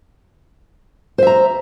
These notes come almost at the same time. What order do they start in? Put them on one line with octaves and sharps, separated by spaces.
C5 E5 A#5